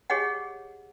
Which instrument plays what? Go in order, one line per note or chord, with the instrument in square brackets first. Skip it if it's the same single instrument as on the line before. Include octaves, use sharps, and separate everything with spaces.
[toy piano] G4 G#4 C#5 D#5 F#5